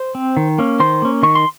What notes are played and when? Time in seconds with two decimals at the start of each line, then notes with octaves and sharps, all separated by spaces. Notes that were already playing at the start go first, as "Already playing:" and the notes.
Already playing: C5
0.15 C4
0.37 D#3
0.58 A#3 C#4
0.80 D#3 C5 C6
1.02 A#3 C#4
1.23 D#3 C#6
1.35 C6